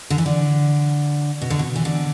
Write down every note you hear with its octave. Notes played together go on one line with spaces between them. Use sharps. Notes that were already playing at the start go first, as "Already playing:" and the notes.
D3
E3
D3
B2
D3
B2
E3
D3